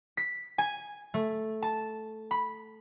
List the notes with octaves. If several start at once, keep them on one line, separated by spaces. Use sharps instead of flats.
B6
G#5
A3
A5
B5